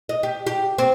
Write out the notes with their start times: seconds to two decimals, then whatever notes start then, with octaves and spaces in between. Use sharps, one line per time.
0.09 D#5
0.23 G4
0.47 G4
0.78 C4